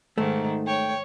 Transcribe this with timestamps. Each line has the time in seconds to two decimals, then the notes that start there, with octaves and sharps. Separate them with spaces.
0.18 G#2 D#3 A3
0.67 C#5 G5